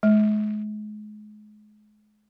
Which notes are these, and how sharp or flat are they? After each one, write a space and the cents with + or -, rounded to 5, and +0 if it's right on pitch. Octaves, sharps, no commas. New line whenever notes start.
G#3 +35